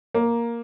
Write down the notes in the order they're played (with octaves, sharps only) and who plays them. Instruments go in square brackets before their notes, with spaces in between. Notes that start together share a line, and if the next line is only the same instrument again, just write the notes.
[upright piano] A#3